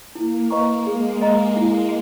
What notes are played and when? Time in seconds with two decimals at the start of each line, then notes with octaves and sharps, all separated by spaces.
0.15 A#3 E4
0.50 B4 D#5 A#5 C#6
0.86 G#3 G#4
1.21 D#5 A#5
1.56 E4